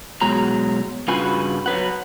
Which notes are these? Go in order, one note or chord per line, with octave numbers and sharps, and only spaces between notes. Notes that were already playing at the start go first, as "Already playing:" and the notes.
B2 F#3 G#3 A#5
G2 C#3 F4 F#4 B4 G#5
F#3 B4 F#5